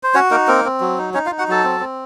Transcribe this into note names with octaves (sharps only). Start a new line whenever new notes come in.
C5
C#4 F#4 C#5
A#3 D#4 A#4
A#3 C4 A#4
C4
F#3
D#4
C#4 D#4 C#5
F4 F5
D#4
F#4 F#5
F#3 A4 A5
C4
C4